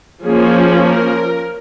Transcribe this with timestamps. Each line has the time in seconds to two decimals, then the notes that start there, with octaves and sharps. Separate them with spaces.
0.24 F3 A#3 C#4 G#4
0.84 A#4